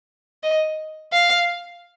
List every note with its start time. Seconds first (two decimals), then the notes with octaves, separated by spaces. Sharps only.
0.43 D#5
1.13 F5